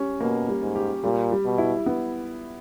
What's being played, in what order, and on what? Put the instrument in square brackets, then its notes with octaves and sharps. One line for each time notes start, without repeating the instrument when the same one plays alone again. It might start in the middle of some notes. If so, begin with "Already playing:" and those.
Already playing: [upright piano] G3 C#4 G4
[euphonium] B2 [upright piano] A#3
[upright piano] G3
[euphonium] G#2
[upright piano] G4
[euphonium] A#2 [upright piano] G3
[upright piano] G3
[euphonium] B2
[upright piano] E4
B3